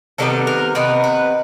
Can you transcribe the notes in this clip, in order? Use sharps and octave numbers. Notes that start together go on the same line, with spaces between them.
C3 D#3 G3 B3 A4
A#4
C3 D#3 B3 B4
B4